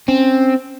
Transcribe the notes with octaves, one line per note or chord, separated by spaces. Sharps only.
C4 C#4